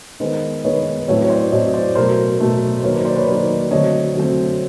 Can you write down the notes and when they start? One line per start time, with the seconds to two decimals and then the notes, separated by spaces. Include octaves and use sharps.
0.20 D#3 G#3 B3 A#4 C5
0.64 D#3 G#3 B3 B4 C#5
1.08 A2 F#3 A3 C4 B4 C#5
1.24 C#5
1.30 C5 D5
1.52 A2 F#3 A3 C4 C#5 D#5
1.73 C5 D5
1.95 B2 F#3 A3 A#4 C5
2.40 B2 F#3 A3
2.80 C5
2.83 D#3 F#3 A#3 B4 C#5
2.94 C5 D5
3.05 C5 D5
3.16 B4 C#5
3.27 D#3 F#3 A#3 C5 D5
3.71 D3 F#3 A3 C4 C#5 D#5
4.15 D3 F#3 A3 C4